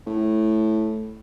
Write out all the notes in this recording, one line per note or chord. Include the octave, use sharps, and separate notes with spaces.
A2